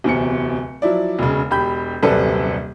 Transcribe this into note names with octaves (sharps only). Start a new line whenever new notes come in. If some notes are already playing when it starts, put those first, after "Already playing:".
D1 E2 C3 C#7
F3 F#3 E4 D5
E1 C#3
E1 G4 B5 G6
D#1 F#2 C3 A4 B4 D5